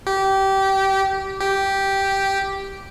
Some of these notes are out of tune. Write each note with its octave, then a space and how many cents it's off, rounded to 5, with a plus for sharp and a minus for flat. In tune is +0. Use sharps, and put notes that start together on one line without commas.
G4 -20
G4 -5